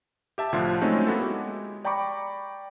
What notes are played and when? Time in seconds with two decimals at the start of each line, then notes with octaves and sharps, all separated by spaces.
0.38 G4 E5 A5
0.52 C2 A2 D3 F3 F4 C6
0.81 F#3 G#3 A3 C4 C#4 D#4
1.06 A#3 B3 E4 F#4 A4
1.22 G#3 G4
1.85 D5 G5 A#5 B5 C#6 D6